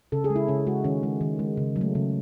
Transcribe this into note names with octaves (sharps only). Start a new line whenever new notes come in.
C#3 A4
G#4
G#3
E4
C#3 C#4
G#3 F#4
D#3 C#4
G#3
D#3
G#3
C#3
F#3
A3
C#3